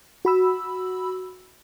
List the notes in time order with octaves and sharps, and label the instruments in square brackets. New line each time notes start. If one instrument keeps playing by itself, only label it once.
[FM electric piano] F#4 B5 E6